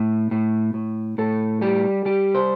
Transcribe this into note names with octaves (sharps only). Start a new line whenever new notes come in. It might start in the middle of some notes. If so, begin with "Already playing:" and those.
Already playing: A2
A2
A2
A2 A4
G3 G4
G3 G4
C5